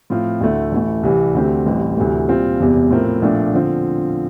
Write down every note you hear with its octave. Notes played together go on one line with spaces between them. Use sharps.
A2 F3 C4 F4
D2 D3 A3 E4
A1 A2 E3 A3
C2 C3 E3 G3
D2 D3 A3 C4 G4
A1 A2 E3 G3 C4
D2 C3 E3 A3
A#2 G3 C4 F4
E1 E2 C3
A2 F3 C4 E4 A#4
A#1 A#2 A3 D4
D3 F3 C4